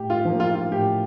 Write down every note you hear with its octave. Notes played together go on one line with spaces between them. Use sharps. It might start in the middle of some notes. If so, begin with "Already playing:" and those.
Already playing: A2 G4
F4
F3 A#3
F4
F4
A2 G4